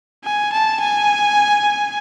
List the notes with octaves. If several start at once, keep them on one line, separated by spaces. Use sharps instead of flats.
G#5
A5
G#5